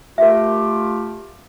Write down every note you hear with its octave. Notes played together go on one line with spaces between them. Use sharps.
A3 F4 G4 A#4 E5